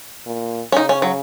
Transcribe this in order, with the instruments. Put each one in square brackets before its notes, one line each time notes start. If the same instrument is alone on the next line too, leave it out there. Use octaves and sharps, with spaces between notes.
[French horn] A#2
[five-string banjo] C#4
[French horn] C#3 [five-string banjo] D#4
[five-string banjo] C#4
F#3